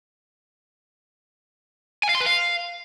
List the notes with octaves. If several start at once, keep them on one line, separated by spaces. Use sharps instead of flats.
G#5
F5
C6
B4
F5